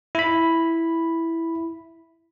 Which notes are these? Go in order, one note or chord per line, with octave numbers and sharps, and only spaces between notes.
E4 B5